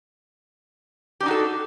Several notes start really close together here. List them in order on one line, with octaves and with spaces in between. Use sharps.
G4 D4 D#4 F#4 A4